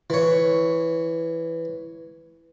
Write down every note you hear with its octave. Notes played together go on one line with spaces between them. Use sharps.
E3 C#5